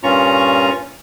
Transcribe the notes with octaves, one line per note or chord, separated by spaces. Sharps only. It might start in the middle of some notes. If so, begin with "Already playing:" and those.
G2 A#2 C#4 F4 A#5 C#6